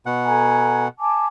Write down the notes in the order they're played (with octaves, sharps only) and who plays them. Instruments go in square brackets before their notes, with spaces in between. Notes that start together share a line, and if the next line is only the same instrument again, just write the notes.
[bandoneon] B2 F#5
[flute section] A4 G#5 A#5
G#5 A5 D6